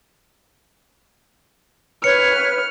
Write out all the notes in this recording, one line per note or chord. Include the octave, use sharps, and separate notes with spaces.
B4 C#5 F6 C#7